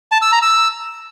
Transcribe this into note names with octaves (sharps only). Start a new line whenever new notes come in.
A5
E6
A#5
E6